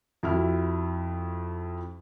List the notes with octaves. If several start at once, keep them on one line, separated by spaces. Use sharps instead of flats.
F2 E4 F#4 F6